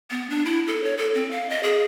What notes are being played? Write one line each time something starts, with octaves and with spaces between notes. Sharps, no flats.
B3
D4
E4
A4
C#5
A4
C4
F5
D#5
G#4